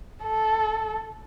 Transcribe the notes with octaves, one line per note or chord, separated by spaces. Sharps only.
A4